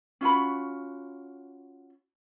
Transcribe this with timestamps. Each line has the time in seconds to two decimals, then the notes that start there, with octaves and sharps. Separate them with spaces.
0.21 C#4 F4 F#4 B5